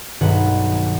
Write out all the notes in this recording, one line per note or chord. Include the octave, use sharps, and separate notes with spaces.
B1 G2 D#3 G#4 B4 F#5